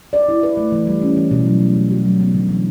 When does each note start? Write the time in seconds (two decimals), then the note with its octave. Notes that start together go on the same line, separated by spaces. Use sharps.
0.13 D5
0.28 E4
0.43 B4
0.57 A3
0.72 E3
0.87 G3
1.02 C#4
1.17 E3
1.31 B2
1.46 F#3
1.60 A3
1.76 B2
1.91 F#4
2.05 F#3
2.20 B3
2.34 D3
2.49 E3